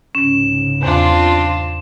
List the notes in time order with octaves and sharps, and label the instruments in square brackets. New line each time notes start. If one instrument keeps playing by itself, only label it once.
[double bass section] C2 G#2 C#3 [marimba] C#4 [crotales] E7
[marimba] E2 [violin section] C4 D4 F4